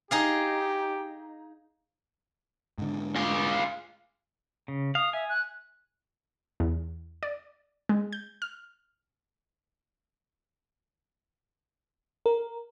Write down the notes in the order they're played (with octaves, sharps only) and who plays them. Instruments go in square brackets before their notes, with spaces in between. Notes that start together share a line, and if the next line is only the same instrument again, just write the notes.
[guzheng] D#4 G#4 F5 [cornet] G4
[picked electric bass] G#2 D3
[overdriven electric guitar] F4 G#4
[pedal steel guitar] C#3
[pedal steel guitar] F5 [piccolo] D#6
[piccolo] E5 [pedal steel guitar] G#5
[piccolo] F#6
[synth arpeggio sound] E2
D5
G#3
G6
F6
[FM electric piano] A#4